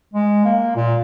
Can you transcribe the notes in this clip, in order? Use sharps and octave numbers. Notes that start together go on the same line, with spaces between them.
G#3
A#3
A#2